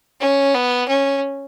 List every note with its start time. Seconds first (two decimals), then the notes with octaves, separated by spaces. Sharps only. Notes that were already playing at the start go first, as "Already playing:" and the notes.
0.21 C#4
0.54 B3
0.89 C#4